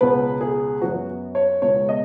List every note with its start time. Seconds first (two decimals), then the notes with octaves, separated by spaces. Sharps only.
0.01 C#2 B2 G#3 B3 B4
0.41 G#4
0.81 F#2 F#3 B3 F#4
1.35 C#5
1.62 C#2 B2 G#3 B3 C#5
1.89 D#5